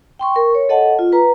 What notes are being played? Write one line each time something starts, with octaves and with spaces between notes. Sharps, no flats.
G5 C6 C#6
A#4 C#6
C#5
A4 D#5 F#5 A5
F4
B4 A#5